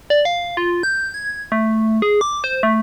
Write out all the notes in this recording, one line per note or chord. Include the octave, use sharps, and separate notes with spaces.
D5
F5
F4
G6
G#6
A3
G#4
D6
C5
A3